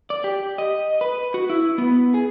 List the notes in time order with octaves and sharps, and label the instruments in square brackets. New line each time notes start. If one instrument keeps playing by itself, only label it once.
[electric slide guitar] D5
G4
D#5
B4
F#4
E4
B3
G#4